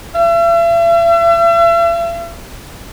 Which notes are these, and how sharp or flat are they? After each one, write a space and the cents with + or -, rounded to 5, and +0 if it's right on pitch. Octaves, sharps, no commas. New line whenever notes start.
E5 +45